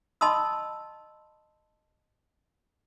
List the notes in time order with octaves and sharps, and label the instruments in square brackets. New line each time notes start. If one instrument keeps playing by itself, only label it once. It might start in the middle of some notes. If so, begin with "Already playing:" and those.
[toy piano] D#5 A5 B5 C6 D#6 E6